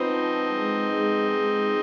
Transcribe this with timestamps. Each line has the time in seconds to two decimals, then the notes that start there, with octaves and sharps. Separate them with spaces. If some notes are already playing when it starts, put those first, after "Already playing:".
Already playing: F3 B3 C4 D#4
0.10 D4
0.50 G#3
0.88 G#2
1.28 G#3
1.66 G#3